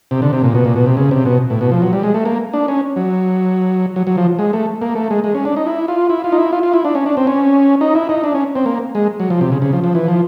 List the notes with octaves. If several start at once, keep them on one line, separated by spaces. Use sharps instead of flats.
C3
D3
C3
A#2
B2
A#2
B2
C3
C#3
C3
B2
A2
B2
F3
F#3
G3
G#3
A3
A#3
D4
C#4
F#3
F#3
F#3
F3
G#3
A3
A#3
A3
G#3
G#3
C#4
D4
D#4
E4
F4
E4
F4
D#4
E4
F4
F4
E4
D4
C#4
D4
C4
C#4
D#4
E4
D#4
D4
C#4
C4
A#3
G#3
F#3
F3
C3
C#3
C#3
F3
F3
E3
F3